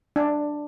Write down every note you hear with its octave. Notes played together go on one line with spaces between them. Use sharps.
D4